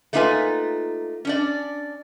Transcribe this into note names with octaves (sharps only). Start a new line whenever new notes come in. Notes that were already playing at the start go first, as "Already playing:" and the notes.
A3 A#3 D#4 F4 B4 G#5
C#4 D4 D5